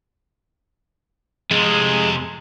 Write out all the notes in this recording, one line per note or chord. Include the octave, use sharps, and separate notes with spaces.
F2 C3 G#3